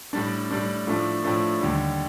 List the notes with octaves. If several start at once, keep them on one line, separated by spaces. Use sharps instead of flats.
A2 G3 D4
A2 G3 D4
A2 F3 A3 D4
A2 F3 A3 D4
D#2 D3 G3